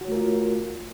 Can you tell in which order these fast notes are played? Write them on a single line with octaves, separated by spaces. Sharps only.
F#4 C#5 A3 A#4 F4